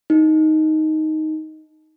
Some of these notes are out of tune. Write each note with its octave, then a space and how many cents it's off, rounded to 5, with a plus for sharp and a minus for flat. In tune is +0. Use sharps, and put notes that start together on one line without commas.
D#4 +5